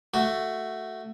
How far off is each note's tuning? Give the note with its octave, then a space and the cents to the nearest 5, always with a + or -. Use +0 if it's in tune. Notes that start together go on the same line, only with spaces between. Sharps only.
A3 +5 F#4 +0